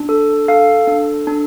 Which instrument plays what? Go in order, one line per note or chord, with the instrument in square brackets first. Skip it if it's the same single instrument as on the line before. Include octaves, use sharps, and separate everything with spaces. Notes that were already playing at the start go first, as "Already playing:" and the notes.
Already playing: [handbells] D4
A4
A4 F5
D4
D4